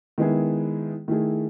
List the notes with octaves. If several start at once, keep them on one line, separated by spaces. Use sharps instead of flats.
D#3 G#3 B3 E4 G#4
D#3 A3 E4 G#4